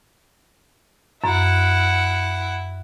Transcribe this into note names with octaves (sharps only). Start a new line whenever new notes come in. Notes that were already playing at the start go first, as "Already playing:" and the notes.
F#2 E4 F#5